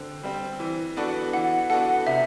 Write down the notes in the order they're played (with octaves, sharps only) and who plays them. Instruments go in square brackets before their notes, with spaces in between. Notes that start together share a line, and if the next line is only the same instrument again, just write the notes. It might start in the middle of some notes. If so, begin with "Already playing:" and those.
Already playing: [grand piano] D3 C4
G3 C4
E3
B3 D4 F#4 A4
[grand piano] E3 [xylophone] F#5
[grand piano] B3 D4 F#4 A4 [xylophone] F#5
[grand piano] C3 [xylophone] E5